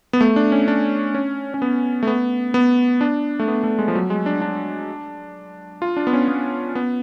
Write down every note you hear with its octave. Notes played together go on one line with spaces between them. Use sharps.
B3
A3
D4
C#4
D4
C#4
C#4
B3
A3
B3
B3
D4
A3
B3
A3
G#3
F3
F#3
G#3
D4
D4
F4
D4
B3
C#4
B3
B3